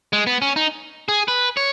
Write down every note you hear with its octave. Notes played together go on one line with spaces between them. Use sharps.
G#3
B3
C#4
D#4
G#4
B4
C#5